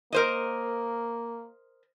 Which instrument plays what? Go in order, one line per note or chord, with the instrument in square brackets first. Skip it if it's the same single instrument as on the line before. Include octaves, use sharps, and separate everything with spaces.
[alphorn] A#3 [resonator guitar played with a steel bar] A#4 C5 D#5